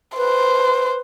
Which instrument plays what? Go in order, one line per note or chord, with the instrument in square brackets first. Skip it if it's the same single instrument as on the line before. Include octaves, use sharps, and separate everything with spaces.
[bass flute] B4 [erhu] C5